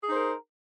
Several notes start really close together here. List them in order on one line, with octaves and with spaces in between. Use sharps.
G#4 D#4 C5 A#4